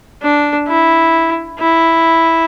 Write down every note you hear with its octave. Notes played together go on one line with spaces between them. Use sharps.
D4
E4
E4